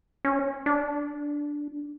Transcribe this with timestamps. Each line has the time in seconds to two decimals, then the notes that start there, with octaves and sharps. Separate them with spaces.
0.25 C#4
0.66 D4